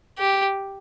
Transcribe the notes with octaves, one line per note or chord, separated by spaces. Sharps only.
G4